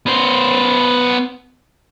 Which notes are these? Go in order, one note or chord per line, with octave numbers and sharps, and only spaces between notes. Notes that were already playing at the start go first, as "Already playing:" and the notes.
B3 C5